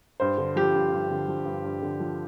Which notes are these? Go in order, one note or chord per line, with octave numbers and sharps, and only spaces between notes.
G2 C5
D3
F3 G4
G2
G2
D3
F3
G2
G2
D3
F3